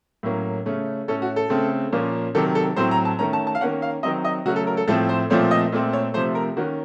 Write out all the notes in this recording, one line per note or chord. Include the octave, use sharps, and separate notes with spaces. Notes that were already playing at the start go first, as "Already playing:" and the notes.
A2 F#3 A#3 C#4
C#3 A3 C#4
A2 A3 C#4 A4
F#4
A4
C#3 A3 C4
A#2 F3 A#3 C#4
C3 D#3 F#3 A4
A4
A2 F#3 C4 C5
A#5
A5
D#3 A3 C#4 A#5
A5
A5
F5
D#3 A#3 C#4 F#5
F5
D#3 F#3 C4 D#5
D#5
C#3 F#3 A3 C#4 F#4
A4
A#4
A4
A2 F3 A3 C4 A4
C5
A#2 F3 A3 C4 C#5
D#5
A#2 A3 C4
C#5
C3 F3 A3 C5
A#4
D#3 A#3 C#4 F#4